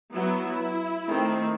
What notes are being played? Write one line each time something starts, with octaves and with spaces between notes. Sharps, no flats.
F#3 B3 E4
D#3 A3 C4